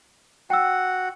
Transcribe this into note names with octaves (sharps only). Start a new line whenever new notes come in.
F#4 F#5 G5 E6